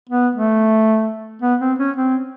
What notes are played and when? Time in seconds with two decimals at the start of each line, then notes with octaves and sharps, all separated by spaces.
0.09 B3
0.35 A3
1.42 B3
1.60 C4
1.79 C#4
1.96 C4